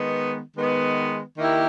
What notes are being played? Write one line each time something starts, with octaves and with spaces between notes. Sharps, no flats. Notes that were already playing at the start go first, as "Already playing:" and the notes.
Already playing: D#3 G#3 B3
D#3 G#3 B3
D#3 A#3 E4 G4